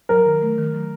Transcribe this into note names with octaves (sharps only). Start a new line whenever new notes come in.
F#3 A#4
D#3
A3
D#3
F#3